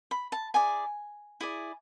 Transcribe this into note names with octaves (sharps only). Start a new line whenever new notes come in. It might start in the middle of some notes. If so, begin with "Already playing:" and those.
B5
A5
E4 G#4 D5 G#5
E4 G#4 D5